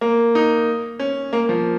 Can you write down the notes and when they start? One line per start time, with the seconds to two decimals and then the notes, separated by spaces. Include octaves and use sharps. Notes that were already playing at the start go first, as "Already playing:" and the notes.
0.01 A#3
0.35 D#4
0.99 C#4
1.33 A#3
1.49 F3